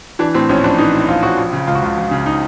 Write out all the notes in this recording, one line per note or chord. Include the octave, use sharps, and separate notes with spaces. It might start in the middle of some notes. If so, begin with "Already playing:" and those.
E3 D4
A2 C4
A#1 C#4
A#1 D4
E3 D#4
A2
A#1 F4
A#1 F#4
F3
C#3
C#2 F4
F#4
C#2 F4
F3
C#3
D#4